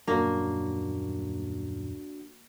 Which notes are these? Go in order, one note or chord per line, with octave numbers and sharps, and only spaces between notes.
D#1 F#2 F#3 A#3 D4 F#4